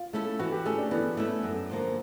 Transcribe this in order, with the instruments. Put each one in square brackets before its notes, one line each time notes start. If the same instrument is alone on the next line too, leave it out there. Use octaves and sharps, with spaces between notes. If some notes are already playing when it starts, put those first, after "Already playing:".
Already playing: [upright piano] F4
[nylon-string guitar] A3 C#4 E4 A4
[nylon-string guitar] E3 [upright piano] F#4
[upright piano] G4
[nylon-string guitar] A3 C#4 E4 A4 [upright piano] G#4
[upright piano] D4
[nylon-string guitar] E3 [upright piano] B3
[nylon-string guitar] A3 C#4 E4 A4
F#2
D3 F3 A#3